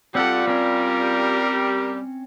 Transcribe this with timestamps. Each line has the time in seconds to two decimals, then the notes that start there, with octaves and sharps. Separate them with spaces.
0.15 G3 C4 F4 A4 F#5
0.48 C4 C#4 A#4